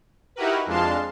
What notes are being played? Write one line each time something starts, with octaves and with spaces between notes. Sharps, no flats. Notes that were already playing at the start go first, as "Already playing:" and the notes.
D#4 E4 F#4 G4 A#4 B4
F2 G#3 D4 F5 A5 C6